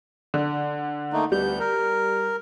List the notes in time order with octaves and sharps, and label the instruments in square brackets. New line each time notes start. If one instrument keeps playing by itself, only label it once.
[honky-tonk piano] D3
[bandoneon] A3 A#3 D#4
[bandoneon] D2 B3 G6 [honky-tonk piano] G3
[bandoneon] A#4